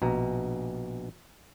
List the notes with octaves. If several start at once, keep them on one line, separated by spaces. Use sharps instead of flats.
A#1 B2 A#5